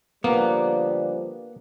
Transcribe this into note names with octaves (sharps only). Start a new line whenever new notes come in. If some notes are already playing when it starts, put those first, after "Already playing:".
D3 F3 G3 A#3 B3 G4 A#5